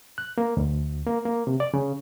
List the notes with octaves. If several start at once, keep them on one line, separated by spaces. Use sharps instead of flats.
F#6
A#3
D2
A#3
A#3
C3
D5
C#3